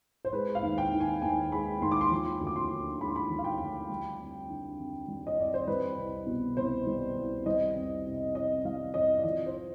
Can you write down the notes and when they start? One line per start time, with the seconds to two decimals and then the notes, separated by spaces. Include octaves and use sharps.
0.25 C5
0.33 G#3 B4
0.55 F5
0.62 D#2
0.78 G5
0.93 D#3
1.01 G#5
1.22 D#2 G#5
1.52 G#3 B5
1.82 D#2 C6
1.91 D6
2.01 C6
2.11 F3
2.41 D2
2.47 D6
2.56 C6
2.70 D3
3.00 G#3 B5
3.08 C6
3.16 B5
3.30 F3
3.39 F5
3.44 G5
3.60 D2
3.90 G3
4.19 F2
4.50 D3
4.79 F2
5.08 G3
5.27 D#5
5.38 F2 D5
5.54 C5
5.67 G3 B4
5.98 C2
6.27 B2
6.57 C2 C5
6.87 G3
7.16 C2
7.46 G3 D#5
7.75 F2
8.06 C3
8.35 F2 D#5
8.65 G3 F5
8.94 F2 D#5
9.18 D5
9.24 F3 D#5
9.46 C5